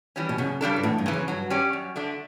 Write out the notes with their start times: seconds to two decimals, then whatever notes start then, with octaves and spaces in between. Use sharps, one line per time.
0.16 E3 G3 C#4
0.29 B2
0.38 F#2 C#3
0.61 C#3 G3 D4 A4
0.76 G2
0.83 E2 A2
0.98 G2
1.06 C#3 E3
1.13 F#2
1.28 G2 F#3
1.50 C#4 G4 D5
1.73 F#2
1.96 D3 A3 D4